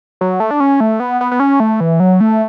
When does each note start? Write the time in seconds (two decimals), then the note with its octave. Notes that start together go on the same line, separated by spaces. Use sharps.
0.21 F#3
0.40 A3
0.51 D4
0.60 C#4
0.80 A3
1.00 B3
1.21 B3
1.31 B3
1.40 C#4
1.60 A3
1.80 E3
2.00 F#3
2.21 A3